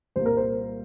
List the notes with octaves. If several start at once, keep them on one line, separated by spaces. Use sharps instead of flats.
C2 A#2 G3 A#3 C5
A#4
C5